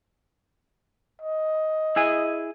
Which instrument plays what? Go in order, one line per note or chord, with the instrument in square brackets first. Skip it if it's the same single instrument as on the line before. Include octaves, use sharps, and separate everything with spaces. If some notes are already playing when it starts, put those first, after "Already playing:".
[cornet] D#5
[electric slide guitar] E4 G#4 G#5